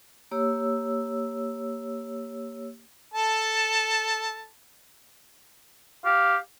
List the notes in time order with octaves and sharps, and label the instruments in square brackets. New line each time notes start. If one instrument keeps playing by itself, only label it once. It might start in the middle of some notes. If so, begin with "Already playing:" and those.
[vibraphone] A#3 G4 C#5 E6
[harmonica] A4 A5
[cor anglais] G4 [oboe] F5